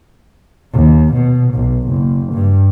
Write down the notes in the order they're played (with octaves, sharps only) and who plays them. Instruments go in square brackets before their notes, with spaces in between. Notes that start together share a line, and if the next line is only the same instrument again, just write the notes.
[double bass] D#2
B2
B1
F#1
G2